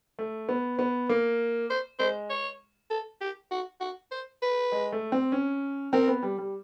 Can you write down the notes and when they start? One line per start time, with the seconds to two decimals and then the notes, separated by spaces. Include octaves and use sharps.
0.19 A3
0.49 B3
0.79 B3
1.09 A#3
1.70 C5
1.99 G#3 C5
2.30 C#5
2.90 A4
3.21 G4
3.51 F#4
3.81 F#4
4.12 C5
4.42 B4
4.72 G#3
4.92 A3
5.12 C4
5.32 C#4
5.93 C4 A#4
6.08 B3
6.23 G3
6.38 G3